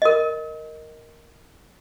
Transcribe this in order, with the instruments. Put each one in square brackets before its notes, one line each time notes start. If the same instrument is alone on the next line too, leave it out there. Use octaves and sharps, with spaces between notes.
[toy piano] A#4 D#5